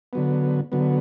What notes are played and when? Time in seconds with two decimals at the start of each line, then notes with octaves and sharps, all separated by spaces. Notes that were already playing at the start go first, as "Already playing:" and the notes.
0.13 D3 F#3 B3
0.72 D3 F#3 B3